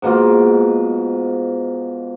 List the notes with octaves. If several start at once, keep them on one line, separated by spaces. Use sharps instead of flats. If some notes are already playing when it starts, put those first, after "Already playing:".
G#2 B2 A#3 F4